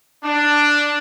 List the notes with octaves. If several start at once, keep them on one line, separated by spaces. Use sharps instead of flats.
D4